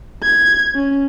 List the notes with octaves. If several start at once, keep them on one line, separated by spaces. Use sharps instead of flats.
G#6
C#4